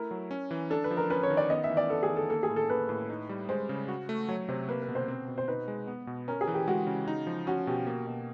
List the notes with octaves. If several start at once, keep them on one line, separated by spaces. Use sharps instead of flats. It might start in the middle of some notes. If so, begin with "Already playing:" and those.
Already playing: A3 E4 A#4
F#3
C#4
E3
D4 A4
B4
F3
A#4
C#4 B4
C#5
D#3
D5
B3 D#5
E5
E3
D5
B3 A4
G#4
D#3
A4
A#3 A4
G#4
A2
A4
A#3 B4
A2
D#4
G3
G#3 C5
C#3
F#4
A3
F#3 C#5
C3 C5
A#3 B4
B4
B2
C5
C4
B2
C5
D#4 B4
G#3
B3
B2
C#4 A#4
G#4
E3
G4
G#3 F#4
C#3
D#4
F3
C#4 F#4
B2 G4
A#3
B2